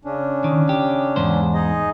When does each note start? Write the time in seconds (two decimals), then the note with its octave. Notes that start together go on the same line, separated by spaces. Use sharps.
0.05 C#3 C#4 D4
0.44 D#3
0.69 G4
1.16 E2 G#2 C5
1.54 D#4 G#4 D#5